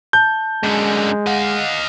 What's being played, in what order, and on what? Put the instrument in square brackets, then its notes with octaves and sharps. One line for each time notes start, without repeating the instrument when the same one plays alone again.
[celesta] A5 [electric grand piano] G6
[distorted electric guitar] F#2 D3 [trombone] G#3
[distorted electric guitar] D#5 F5 [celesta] F#5